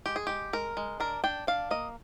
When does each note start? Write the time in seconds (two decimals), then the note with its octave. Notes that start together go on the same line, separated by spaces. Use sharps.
0.06 G#3 G4
0.16 G#4
0.27 G#3 G4
0.53 G#3 A#4
0.77 G#3
1.00 D4 A#4
1.24 D4 G5
1.47 D4 F5
1.71 A#3 D#5